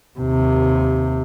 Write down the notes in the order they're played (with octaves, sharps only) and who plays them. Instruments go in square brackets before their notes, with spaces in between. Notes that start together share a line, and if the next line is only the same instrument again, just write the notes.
[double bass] D#2 C3